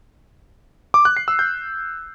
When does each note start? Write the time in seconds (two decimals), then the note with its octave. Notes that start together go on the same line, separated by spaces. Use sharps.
0.94 D6
1.05 F#6
1.17 C7
1.28 E6
1.39 G6